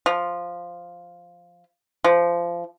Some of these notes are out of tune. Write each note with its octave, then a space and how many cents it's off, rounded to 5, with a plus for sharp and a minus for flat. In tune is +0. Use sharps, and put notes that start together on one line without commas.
F3 +0
F3 -20